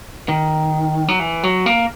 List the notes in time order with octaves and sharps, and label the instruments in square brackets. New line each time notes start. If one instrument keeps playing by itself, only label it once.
[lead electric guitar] D#3
F#3
E3
F#3
A#3